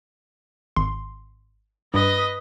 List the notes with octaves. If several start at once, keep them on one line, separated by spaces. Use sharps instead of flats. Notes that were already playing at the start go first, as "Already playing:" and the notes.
G#1 C6
G2 B4 D#5